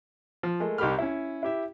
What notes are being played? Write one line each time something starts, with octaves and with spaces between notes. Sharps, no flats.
F3
G#3 A3 A#4
C2 D#4 G4 A#4 B5 F6
C#4 E4
E4 G4 E5